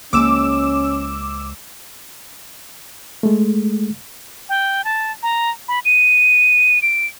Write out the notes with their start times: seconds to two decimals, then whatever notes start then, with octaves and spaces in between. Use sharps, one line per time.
0.13 C#2 F3 G#3 A#3 C#4 D6 E6 E7
3.23 G#3 A3
4.49 G5
4.84 A5
5.23 A#5
5.68 B5
5.85 D#7
6.82 D7